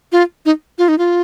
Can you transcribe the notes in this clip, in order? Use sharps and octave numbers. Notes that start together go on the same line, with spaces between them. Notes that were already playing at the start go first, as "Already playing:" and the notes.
F4
D#4
F4
D#4
F4